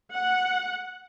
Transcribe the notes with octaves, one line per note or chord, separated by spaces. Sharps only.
F#5